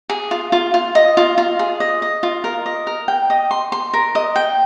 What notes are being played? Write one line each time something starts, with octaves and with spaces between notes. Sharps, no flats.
G#4
F4
F4
F4
D#5
F4
F4
G#4
D#5
D#5
F4
A#4
D#5
A#4
G5
D#5
C6
C6
A#4
D#5
G5